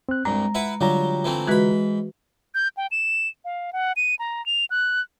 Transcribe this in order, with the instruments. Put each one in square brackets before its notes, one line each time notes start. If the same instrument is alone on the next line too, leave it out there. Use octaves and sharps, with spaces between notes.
[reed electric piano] C4 F#6
[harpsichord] C2 G2 [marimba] G#3 [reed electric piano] A#5
[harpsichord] E4 B4 F#5
[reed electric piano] D3 F4 A#5 [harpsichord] F#3 G3
[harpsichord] E3 A3 C4
[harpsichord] G#2 B5 [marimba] E3 F#4 B4
[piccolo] G6
G5
E7
F5
F#5
D#7
A#5
F7
F#6